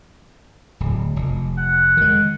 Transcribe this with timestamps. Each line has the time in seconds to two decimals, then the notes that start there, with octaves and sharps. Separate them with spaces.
0.80 D1
1.16 F1
1.58 F#5
1.97 D#3 G#3